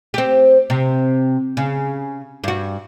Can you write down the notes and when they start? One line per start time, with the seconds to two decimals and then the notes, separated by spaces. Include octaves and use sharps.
0.14 C4 G4
0.70 C3
1.57 C#3
2.44 G2 F#4